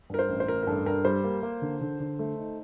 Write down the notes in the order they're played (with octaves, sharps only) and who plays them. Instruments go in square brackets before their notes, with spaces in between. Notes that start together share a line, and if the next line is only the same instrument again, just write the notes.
[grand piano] G2 [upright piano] A#4
[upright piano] C5
[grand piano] A1
[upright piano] C5
[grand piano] A1 [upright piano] A#4
[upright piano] A#4
[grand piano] G2 [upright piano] A4
[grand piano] G2 [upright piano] A#4
[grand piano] G3 [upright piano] C5
[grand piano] A#3
A#3
D3
D3
D3
A3
D#4